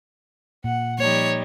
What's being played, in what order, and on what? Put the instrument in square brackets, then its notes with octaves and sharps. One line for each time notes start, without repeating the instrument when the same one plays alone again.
[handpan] A#2 [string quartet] F#5
[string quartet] F3 G3 D#4 [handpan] A#3 [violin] C#5